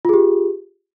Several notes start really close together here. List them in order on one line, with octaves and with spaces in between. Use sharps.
F4 G#4 G4